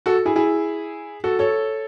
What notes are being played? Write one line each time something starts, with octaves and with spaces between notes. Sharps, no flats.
F#4 A4
E4 G#4
E4 G#4
F#4 A4
A4 C#5